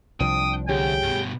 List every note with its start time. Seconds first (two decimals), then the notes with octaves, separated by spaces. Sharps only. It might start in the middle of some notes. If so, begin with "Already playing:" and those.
0.20 C2 F3 D4 G5 D#6
0.69 D2 C#4 G4 G#4 G5
1.03 G2 B2